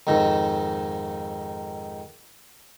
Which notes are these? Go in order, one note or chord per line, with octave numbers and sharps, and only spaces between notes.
F2 G#2 D#3